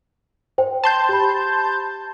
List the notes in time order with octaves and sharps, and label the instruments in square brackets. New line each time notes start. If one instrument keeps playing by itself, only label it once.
[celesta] C5 G5
[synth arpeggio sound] A5 C6 G6
[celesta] G4 B5